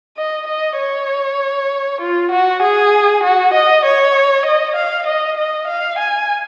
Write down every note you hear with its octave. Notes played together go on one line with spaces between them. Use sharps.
D#5
D#5
C#5
F4
F#4
G#4
F#4
D#5
C#5
D#5
F5
D#5
D#5
F5
G#5